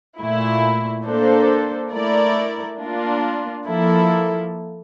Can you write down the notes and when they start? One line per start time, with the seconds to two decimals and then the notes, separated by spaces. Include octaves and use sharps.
0.19 A#2 A3 E4
1.05 A#3 D4 A4 C5
1.92 A3 E4 A#4 D5
2.79 A#3 D4 F4
3.66 F3 A#3 E4 A4